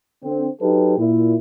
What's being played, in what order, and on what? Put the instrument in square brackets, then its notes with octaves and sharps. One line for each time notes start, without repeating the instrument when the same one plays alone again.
[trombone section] D3 C4
F#3 D#4 G4 A4 B4
A#2 E4